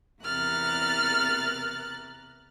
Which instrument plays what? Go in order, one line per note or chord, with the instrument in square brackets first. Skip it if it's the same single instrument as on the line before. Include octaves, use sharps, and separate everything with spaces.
[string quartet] E2 C3 A#4 F6 F#6 A6